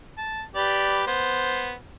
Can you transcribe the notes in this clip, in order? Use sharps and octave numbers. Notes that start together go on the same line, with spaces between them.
A5
G4 B4 D5
B3 C5